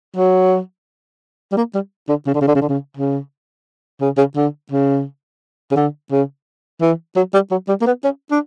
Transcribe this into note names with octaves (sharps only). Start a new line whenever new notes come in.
F#3
G3
A#3
G3
D3
C#3
D3
C#3
D3
C#3
D3
C#3
C#3
C#3
C#3
D3
C#3
C#3
D3
C#3
E3
F#3
G3
F#3
G3
A#3
B3
C#4
D4